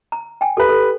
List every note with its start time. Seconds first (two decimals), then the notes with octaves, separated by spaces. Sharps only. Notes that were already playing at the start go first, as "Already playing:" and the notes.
0.12 A#5
0.41 G5 G#5
0.57 G4 A4 B4
0.69 A4